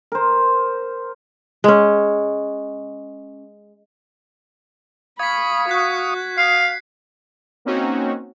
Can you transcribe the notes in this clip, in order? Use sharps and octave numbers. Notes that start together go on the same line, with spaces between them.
A#4 C5
G#3 C#4
F5 B5 C#6 D#6 G#6 B6
F#4 F#6 B6
F5 D#6 C7
A#3 C4 C#4 D#4 F#4